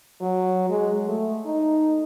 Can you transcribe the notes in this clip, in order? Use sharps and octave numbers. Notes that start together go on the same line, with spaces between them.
F#3
G#3
A3
D#4